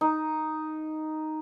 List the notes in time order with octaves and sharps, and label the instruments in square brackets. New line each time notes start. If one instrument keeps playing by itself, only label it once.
[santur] D#4